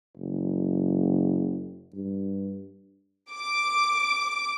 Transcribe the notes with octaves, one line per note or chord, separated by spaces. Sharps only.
F#1
G2
D6